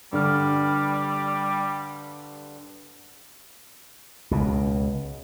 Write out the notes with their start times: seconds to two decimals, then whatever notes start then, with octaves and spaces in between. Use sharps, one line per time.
0.13 G2 D3 G3 F6
4.31 C#2 B2